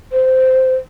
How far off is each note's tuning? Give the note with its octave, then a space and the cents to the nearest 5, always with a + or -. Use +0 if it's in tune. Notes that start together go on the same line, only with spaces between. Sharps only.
C5 -10